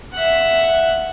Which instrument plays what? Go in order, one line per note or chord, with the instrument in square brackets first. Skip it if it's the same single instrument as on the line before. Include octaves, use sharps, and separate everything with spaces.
[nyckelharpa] E5 F#5